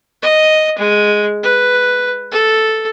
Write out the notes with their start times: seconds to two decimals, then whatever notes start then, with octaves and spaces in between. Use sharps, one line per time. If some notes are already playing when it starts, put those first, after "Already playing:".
0.22 D#5
0.78 G#3
1.43 B4
2.32 A4